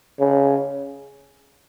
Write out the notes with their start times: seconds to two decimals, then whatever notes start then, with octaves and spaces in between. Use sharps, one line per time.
0.20 C#3